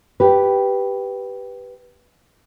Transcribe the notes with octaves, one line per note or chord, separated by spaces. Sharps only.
G4 B4